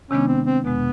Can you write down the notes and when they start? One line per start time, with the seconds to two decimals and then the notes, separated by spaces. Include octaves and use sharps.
0.11 C3 D#3 G#3 B3 C#4 D4
0.28 C4
0.46 C4
0.64 E2 B2 G#3 B3